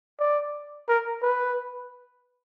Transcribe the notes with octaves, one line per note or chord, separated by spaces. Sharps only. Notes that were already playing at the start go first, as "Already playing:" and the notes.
D5
A#4
B4